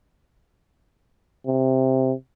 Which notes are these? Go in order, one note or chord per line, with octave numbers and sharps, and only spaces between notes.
C3